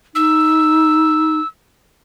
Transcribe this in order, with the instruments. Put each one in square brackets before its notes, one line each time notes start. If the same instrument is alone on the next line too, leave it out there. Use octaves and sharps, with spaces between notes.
[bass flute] D#4 [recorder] E6